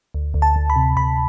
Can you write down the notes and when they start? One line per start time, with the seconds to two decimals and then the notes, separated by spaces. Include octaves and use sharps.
0.14 D2
0.34 D2
0.42 A5
0.56 D2
0.70 B5
0.76 C3
0.96 D2 B5